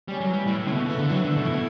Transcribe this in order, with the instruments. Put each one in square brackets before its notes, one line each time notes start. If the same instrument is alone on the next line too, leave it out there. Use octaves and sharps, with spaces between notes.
[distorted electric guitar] G3 [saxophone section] C#4
[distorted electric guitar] F#3
[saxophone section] E3
[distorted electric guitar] G3
[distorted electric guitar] A2 [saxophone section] E4
[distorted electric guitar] A2
[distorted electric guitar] C#3 [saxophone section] A3
[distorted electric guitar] B2
[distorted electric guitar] C#3 [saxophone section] E3
[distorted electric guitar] D3
[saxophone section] E3
[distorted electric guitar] F#3
[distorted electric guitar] D3 [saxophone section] A3
[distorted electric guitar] B2
[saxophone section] E4
[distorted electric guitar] B2